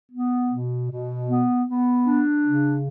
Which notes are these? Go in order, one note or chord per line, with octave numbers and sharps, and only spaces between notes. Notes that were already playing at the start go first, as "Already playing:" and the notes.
B3
B2
B2
B3
B3
D4
C#3